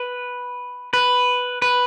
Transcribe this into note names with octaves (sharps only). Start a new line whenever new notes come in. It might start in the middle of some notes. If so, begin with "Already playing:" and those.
Already playing: B4
B4
B4